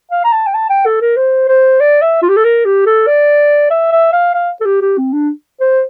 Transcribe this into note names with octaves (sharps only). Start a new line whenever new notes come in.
F5
A#5
A5
G5
A5
G5
A4
A#4
C5
C5
D5
E5
F4
G4
A4
A#4
G4
A4
D5
E5
E5
F5
F5
A4
G4
G4
C4
D4
C5